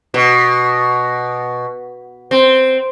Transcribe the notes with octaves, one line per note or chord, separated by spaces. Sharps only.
B2
C4